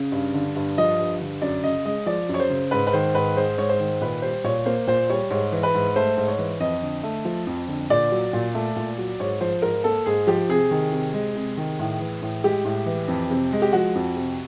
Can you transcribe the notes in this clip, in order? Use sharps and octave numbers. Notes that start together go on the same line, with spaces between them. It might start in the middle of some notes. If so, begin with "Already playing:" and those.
Already playing: C#3
G2
D3
G2
F3 D#5
G2
D3
F#2 D5
C#3 D#5
G#3 D#5
F3 D5
F#2
C#5
C5
C#3
G#2 B4
B4
D#3 C5
G#2 B4
G#3 C5
G#2 C#5
C5
D#3
A#2 B4
G3 C5
A#2 C#5
A#3 C5
A#2 C5
G3 C#5
G#2 C#5
E3
B4
G#2
A3 C5
G#2
C#5
E3
F2 D#5
D3
A3
F3
F2
D3
A#2 D5
F#3
A#2
A3
A#2
F#3
G#2 C#5
F3 C5
G#2 A#4
A#3 A4
G#2 G#4
F3 G4
C3 G#4
D#3
C3
G#3
C3
D#3
A2
E3
A2
G#3 G4
A2
E3
F2
C3
G#3
G4
F3 F#4
F2
C3